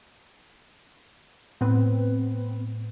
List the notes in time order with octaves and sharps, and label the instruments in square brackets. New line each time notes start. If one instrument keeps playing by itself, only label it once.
[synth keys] A2 [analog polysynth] B3 C4 B4